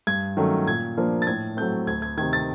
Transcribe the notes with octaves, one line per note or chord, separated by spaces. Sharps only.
G2 G#6
D#3 F#3 A3 C#4
A#2 G#6
F3 A#3 D4 F4
A6
A2 G#6
F#3 A3 C4 G6
D2 G#6
G#6
C3 D#3 G#6
A6